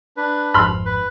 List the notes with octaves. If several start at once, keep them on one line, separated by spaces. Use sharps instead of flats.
D4 B4
G#1 F2 G#2 B5 C6 F6
B4